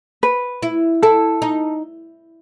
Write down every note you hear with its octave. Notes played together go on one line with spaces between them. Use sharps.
B4
E4
E4 A4
D#4